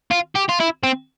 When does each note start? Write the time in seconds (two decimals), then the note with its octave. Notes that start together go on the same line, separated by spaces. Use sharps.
0.11 F4
0.35 G4
0.49 F4
0.60 E4
0.83 C4